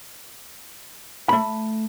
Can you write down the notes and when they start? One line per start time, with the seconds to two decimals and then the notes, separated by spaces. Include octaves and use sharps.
1.29 A3 B5